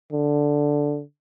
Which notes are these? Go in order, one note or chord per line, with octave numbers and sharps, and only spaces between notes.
D3